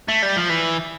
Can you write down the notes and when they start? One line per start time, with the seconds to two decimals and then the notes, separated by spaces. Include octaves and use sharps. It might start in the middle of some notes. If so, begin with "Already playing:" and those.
0.09 A3
0.23 G3
0.36 F3
0.50 E3